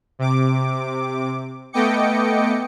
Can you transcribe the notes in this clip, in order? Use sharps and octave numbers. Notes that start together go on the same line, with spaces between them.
C3 D6
A3 B3 D#5 G5 D6 C#7